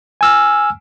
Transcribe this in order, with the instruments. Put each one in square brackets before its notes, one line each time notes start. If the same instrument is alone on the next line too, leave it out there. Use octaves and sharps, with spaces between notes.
[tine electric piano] G#5 E6 F6